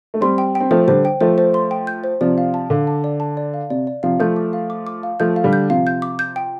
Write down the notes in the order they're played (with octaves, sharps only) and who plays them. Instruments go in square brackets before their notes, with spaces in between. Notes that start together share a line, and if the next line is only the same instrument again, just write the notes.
[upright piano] A3
[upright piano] G3 C4 [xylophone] C6
[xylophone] G5
G5
[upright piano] C4
[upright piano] F3 A3 [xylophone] C5
[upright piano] D3 G3 [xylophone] C5
[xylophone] G5
[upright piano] F3 A3 [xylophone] C5
[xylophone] C5
C6
G5
G6
C5
[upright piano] C3 F3 [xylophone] D5
[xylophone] F5
A5
[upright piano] D3 [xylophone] F5
[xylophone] A5
D5
A5
D5
F5
[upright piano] C3 [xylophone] D5
[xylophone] D5
[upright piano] C3 F3 [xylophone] F5
[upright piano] F3 A3 [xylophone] G6
[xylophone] D6
F5
D6
D6
F5
[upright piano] F3 A3 [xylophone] G6
[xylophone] F5
[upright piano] D3 G3
[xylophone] G6
[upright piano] C3 F3 [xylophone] F5
[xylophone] G6
D6
G6
G5